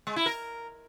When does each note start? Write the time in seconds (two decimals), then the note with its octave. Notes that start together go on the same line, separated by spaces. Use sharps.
0.07 G#3
0.16 E4
0.26 A#4